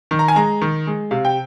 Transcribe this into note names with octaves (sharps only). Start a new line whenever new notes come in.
D#3
A#5
G#5
G#3 A#5
D#3
G#3
C3 F5
G5